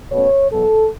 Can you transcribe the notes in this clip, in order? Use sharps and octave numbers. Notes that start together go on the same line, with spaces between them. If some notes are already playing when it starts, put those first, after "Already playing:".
B2 A3 C#4 C#5
E2 B2 F#3 A4